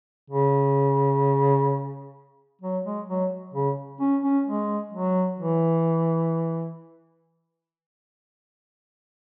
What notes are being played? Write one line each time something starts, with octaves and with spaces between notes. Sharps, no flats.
C#3
F#3
G#3
F#3
C#3
C#4
C#4
G#3
F#3
E3